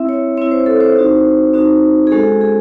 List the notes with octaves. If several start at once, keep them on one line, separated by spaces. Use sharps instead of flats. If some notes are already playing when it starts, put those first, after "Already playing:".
Already playing: C4 E4 E5
C#5
C4 E4 C#5
C5
A4
C5
C4 D#4 F#4
C4 D#4 F#4
G#4
G#3 C#4 F#4 A4
G#4